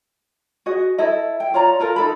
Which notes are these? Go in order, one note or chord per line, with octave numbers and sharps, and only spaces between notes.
F#4 G#4 D#5
E4 A4 D#5
G5
F4 C#5 D5 A#5
F4 A4 A#4
D#4 A4 B5